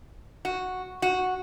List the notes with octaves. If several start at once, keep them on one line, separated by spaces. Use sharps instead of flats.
F#4
F#4